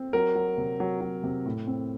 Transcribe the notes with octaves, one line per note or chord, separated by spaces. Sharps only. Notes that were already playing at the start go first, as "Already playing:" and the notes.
Already playing: C4
F#3 A#4
F#3
C3
F#3
F#3
C3
A2
C4